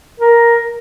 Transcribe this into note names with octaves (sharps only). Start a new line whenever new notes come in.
A#4